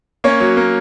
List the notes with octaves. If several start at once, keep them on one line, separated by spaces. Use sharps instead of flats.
A#3 C#4 C#5
F#3
A#3